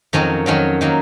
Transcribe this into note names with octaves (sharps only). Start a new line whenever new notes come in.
F2 D#3 F#3 C#4
F2 D#3 F#3 C#4
D#3 F#3 A#3